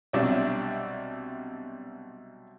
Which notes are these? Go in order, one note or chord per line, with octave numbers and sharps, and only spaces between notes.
B1 C3 G3 D4 E5 E6